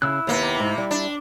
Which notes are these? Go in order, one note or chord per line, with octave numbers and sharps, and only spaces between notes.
C#3 E4 E6 F#6
D#2 C3 A#3 B3
G#2
G3
D4